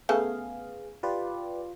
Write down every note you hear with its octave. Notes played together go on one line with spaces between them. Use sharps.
C#3 A3 B3 G#4 A4 F5
F4 G4 B4 D5